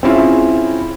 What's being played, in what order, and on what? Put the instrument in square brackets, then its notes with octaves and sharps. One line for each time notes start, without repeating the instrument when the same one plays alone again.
[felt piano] C4 C#4 E4 F4 G#4